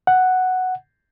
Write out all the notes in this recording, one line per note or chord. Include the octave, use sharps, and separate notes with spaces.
F#5